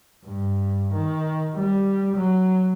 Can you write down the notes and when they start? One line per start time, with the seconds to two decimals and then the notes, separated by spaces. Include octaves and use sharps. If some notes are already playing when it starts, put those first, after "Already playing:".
0.25 G2
0.93 D#3
1.55 G3
2.16 F#3